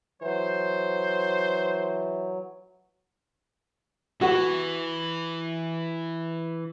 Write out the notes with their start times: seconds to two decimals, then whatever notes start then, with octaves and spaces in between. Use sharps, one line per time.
0.22 E3 F#3 C5
4.21 E3 F#4